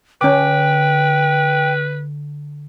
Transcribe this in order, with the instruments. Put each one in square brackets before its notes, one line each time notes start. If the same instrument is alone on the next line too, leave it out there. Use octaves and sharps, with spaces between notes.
[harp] D3 [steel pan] C#4 D6 [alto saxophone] B4 [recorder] G5